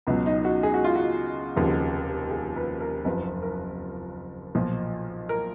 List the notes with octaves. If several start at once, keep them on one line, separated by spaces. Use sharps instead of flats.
C#2 B2 F#3 B3
D#4
F#4
G#4
F#4
F4
F#4
F1 D#2 C#3 F3
G#4
B4
A#4
F#1 F2 F3 B4
A#4
B1 A#2 F3
A#4